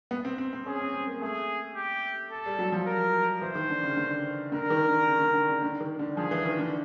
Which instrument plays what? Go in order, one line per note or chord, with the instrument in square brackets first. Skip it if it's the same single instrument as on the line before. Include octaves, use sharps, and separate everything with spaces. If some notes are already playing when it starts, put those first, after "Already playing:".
[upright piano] B3
C4
C4
C4
[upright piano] C#4 [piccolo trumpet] G#4
[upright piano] C4
C4
A#3
[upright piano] A3 [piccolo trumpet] G#4
[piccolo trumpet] G4
A4
[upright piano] G3
F#3
F3
[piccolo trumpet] A#4
[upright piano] E3 [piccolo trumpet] C5
[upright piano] D#3
D3
C#3
D3
[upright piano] D3 [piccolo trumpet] A#4
[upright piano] D#3
D3
C#3
D3
D3
C#3
D3
D#3
D3
[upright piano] F3 [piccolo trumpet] G#4
[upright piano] E3
D#3
D3